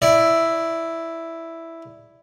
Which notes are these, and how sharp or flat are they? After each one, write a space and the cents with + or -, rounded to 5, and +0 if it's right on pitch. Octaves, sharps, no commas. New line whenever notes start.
E4 +0 D5 +0